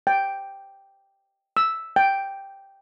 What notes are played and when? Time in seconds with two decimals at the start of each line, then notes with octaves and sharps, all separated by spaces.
0.07 G5
1.57 E6
1.96 G5